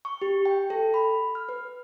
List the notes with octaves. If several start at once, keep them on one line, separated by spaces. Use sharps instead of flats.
C#6
G4
G5
A4
B5
F6
B4